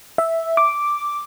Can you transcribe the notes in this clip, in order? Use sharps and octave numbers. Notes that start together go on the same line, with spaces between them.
E5
D6